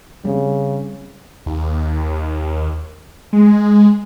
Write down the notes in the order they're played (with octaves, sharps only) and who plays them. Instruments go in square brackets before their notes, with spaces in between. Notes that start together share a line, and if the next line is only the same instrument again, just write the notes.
[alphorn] C#3 [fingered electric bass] G3 A3 C4
[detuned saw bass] D#2
G#3